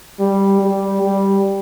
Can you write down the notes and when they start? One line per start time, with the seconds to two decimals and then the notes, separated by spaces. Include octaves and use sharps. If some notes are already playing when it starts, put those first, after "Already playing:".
0.19 G3
0.61 G3
1.02 G3